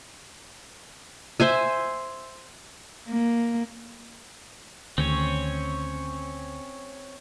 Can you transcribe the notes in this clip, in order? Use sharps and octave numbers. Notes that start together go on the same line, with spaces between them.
C5 E5 G#5
A#3
D2 D#3 C4 C#4 C#5